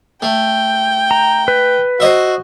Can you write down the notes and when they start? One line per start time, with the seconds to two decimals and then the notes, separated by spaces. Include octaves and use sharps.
0.22 A3 G5
1.11 A#5
1.48 B4
2.00 F#4 C5 D#5 E5